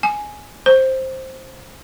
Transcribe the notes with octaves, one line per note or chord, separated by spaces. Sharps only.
G#5
C5